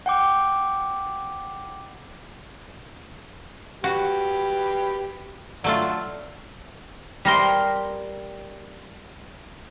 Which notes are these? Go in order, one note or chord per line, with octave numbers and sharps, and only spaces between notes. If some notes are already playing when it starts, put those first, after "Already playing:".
F#5 G5 D6
F#4 G4 B4
D3 F#3 A3 D4 F4
G3 A#4 C6